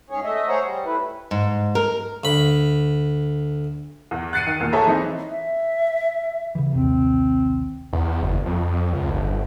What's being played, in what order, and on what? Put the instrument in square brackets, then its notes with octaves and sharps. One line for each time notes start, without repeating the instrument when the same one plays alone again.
[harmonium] G#2 C#4 G#4 C#5
A3 D#5 E5
G#4 C5 C#5 F#5 A#5
G3
A3 E4 B4
[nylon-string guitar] G#2
A#4
[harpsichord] D2 B5
[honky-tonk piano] E2
F#6 A6 C7 C#7 D#7
D#3
E2 A#2 A#3
G#4 A4 C#5 E5 G#5 A#5
E3 C4 D#4
[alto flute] E5
[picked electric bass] C#3 E3
[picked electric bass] A#1 D#2 C3 [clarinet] C4
[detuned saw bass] E2
F#1
F2
C#2
G1